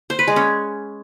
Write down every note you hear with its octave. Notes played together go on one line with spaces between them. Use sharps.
C5
B4
G#3
C#4